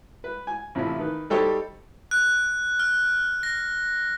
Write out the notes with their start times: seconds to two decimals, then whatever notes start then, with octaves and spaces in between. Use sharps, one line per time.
0.24 B4
0.47 G#5
0.75 A1 C3 F3 E4
0.99 D#3 B4
1.30 G3 D#4 G4 A4 C5 C#5
2.11 F#6
2.79 F6
3.43 A#6